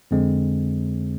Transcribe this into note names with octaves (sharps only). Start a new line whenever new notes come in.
F2 D3 G#3 C4